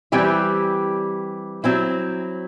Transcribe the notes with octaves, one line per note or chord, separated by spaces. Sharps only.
E3 G3 C4 E4 G4
F#3 C4 E4